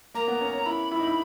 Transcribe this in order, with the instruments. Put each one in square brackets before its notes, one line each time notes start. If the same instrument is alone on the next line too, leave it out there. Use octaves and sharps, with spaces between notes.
[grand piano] A#3 [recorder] A#5
[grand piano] B3
C#4
C#4
[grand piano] E4 [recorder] B5
[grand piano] E4
D#4
E4